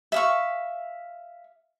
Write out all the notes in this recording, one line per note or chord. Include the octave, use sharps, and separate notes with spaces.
E5 F5 C#6